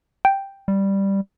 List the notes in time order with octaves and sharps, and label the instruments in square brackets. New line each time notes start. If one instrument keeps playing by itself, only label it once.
[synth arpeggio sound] G5
[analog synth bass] G3